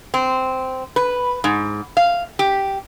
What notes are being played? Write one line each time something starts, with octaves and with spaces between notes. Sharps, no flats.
C4
B4
G#2
F5
G4